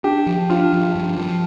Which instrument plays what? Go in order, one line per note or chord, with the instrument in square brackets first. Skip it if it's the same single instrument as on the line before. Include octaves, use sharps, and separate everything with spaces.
[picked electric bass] D4 [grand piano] G4
[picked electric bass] F3
[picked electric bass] D4 [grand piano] F4
[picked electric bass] F3
G2
F3